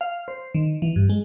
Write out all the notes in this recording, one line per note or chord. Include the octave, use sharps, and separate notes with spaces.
F5
C5
D#3
E3
G2
G#3